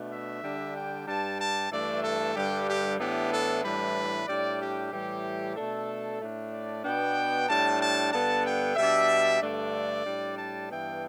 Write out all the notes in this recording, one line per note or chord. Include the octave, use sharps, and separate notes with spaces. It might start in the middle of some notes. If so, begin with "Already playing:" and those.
Already playing: B2 A3 D4
E5
D3 G3 D4
G5
G2 G3 D4 A5
A5
G2 E3 A3 D4 D5
A4
G2 D3 G3 G4
G4
A2 E3 B3 D4 G4
A4
A2 E3 G3 D4 B4
A2 G3 D4 D5
G4
A2 E3 G3 G4
B2 A3 D4 A4
A2 A3 D4
D5
B2 B3 D4 G5
A2 G3 D4 A5
A5
G2 D3 B3 A5
G5
B2 G3 D4 E5
G2 D3 A3 D4 D5
A2 G3 D4
A5
G2 E3 B3 D4 G5